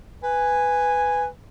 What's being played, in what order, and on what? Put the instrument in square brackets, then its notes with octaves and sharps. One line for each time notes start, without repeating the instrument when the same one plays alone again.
[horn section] B4 G#5